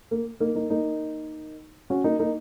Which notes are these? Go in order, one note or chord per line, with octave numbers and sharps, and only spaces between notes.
A#3
A#3 D#4
A#3 D#4
A#3 D#4
C#4 F#4
A#3 D#4
A#3 D#4